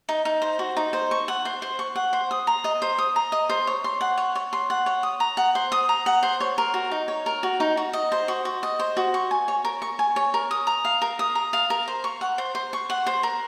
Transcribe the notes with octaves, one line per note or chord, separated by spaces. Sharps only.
D#4
D#4
C5
F#4
D#4
C5
C#6
F#5
C5
C5
C#6
F#5
C5
D#6
A#5
D#5
C5
D#6
A#5
D#5
C5
C#5
C6
F#5
C#5
C#5
C6
F#5
C#5
D#6
A#5
F#5
C5
D#6
A#5
F#5
C5
C#5
A#4
F#4
D#4
C#5
A#4
F#4
D#4
F#4
D#5
C5
F#4
F#4
D#5
C5
F#4
C#6
G#5
C#5
A#4
C#6
G#5
C#5
A#4
D#6
A#5
F5
A#4
D#6
A#5
F5
A#4
C5
C#6
F#5
C5
C5
C#6
F#5
C5
A#4